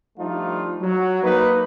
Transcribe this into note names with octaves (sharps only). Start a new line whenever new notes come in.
F3 G3 A3 D4 D#4 F4
F#3
A#3 D#4 B4